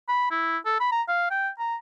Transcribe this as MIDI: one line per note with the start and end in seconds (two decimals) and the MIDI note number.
0.09 0.27 83
0.31 0.58 64
0.66 0.76 69
0.80 0.91 83
0.92 1.02 82
1.08 1.30 77
1.31 1.49 79
1.59 1.76 82